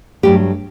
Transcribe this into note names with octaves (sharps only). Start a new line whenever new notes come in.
G2 F#3 A3 G4